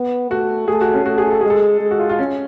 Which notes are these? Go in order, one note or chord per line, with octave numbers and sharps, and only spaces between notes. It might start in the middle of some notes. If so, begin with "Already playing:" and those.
Already playing: B3
A3 F#4
A3 G#4
F#4
C#4
A3 F#4
G#4
A4
G#3 G#4
A4
G#3
F#4
F4
F4
C#4